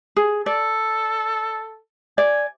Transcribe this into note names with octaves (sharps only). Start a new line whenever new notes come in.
G#4
A4 D5
D5 G#5